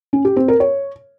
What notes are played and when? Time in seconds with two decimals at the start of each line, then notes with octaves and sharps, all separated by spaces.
0.13 C#4
0.25 G4
0.37 C4
0.48 A#4
0.60 C#5